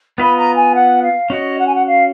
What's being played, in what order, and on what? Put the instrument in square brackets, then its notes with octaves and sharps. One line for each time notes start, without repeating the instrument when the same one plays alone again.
[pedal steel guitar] B3 F4 B4 D#5 [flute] B5
[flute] A#5
G#5
F#5
F5
[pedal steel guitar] C#4 F#4 C#5 [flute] D#5
[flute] F#5
G#5
F#5
F5